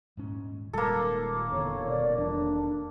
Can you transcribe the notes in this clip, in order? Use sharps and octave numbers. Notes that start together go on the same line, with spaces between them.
D#1 G#2 C#4
D#1 A#2 G3 G#3 A#3 A4
E2 D3 C#5
B2 D5
E2 D4